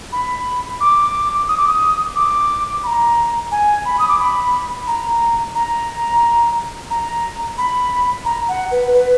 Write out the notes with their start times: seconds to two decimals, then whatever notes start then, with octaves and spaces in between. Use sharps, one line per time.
0.12 B5
0.81 D6
1.49 D#6
1.57 D6
1.68 D#6
2.16 D6
2.84 B5
2.87 A#5
3.51 G#5
3.85 B5
3.99 D#6
4.08 D6
4.19 B5
4.87 A#5
5.55 A#5
6.90 A#5
7.58 B5
8.25 A#5
8.48 F#5
8.71 B4
8.94 B4